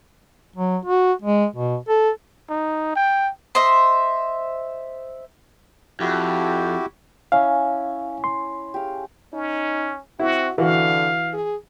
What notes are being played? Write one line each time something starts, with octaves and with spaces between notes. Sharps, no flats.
F#3
F#4
G#3
B2
A4
D#4
G5
C5 D#5 E5
F2 E4 F#4 G4
C#4 E4 F5
C6
G4 G#4 F5
C#4 D#4
C4 E4 F#4
D3 E3 F#4 F5
G#4